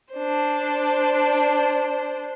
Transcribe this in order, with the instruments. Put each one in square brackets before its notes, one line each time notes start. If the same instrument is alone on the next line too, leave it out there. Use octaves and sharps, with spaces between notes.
[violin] D4 C5